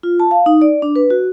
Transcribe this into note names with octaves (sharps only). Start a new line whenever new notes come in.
F4
A5
F5
D#4
D5
D4
B4
F#4